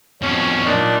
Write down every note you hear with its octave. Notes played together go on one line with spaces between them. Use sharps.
F2 B2 C#4
A#2 D4 D#4